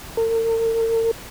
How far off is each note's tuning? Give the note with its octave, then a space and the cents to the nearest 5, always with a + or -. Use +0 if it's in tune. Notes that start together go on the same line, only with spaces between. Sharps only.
A#4 -45